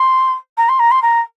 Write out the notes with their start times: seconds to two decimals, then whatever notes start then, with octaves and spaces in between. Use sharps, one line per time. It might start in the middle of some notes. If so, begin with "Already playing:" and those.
Already playing: C6
0.57 A#5
0.68 C6
0.79 A#5
0.91 C6
1.02 A#5